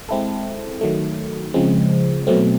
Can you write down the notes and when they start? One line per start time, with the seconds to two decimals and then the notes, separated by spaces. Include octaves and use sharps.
0.09 G#3 C4 E4 A4
0.81 D#3 F#3 A3
1.54 C#3 F3 G#3 C4
2.27 B2 F#3 A3 C4